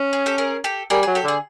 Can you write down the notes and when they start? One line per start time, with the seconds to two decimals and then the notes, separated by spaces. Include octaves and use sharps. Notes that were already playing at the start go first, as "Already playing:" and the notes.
Already playing: C#4
0.13 G#4
0.26 G4 A4
0.38 G#4 A#4
0.64 G4 A4
0.90 G3 G#4 A#4
1.03 G#4
1.07 F#3
1.15 G4 A4
1.24 D3 G#4